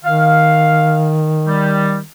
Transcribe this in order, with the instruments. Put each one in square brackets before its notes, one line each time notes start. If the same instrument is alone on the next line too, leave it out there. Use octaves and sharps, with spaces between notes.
[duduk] D#3 [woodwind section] F5
[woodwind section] G3